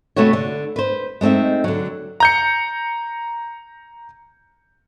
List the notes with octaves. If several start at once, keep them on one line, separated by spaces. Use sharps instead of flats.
C3 A3 B3 F#4 C#5
D3
B4 C5
G#3 A3 C4 D#4 E5
D3 F#3
A#5 G6 C#7